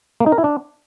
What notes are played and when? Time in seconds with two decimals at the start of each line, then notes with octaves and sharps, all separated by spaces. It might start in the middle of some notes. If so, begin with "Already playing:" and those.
0.20 A#3
0.26 D#4
0.32 A#4
0.38 E4
0.44 D4